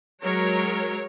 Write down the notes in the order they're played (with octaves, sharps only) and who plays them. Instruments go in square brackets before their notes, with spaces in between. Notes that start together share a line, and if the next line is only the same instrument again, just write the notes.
[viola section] F#3 G#3 A#4 C#5